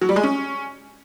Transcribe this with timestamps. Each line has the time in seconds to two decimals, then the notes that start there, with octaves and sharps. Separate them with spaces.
0.01 F#3
0.09 G3
0.16 G#3
0.23 C#4